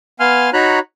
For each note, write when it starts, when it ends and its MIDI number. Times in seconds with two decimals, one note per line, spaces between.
0.20 0.50 59
0.20 0.50 77
0.20 0.50 80
0.20 0.50 84
0.20 0.50 89
0.53 0.79 63
0.53 0.79 66
0.53 0.79 73
0.53 0.79 82
0.53 0.79 83
0.53 0.79 90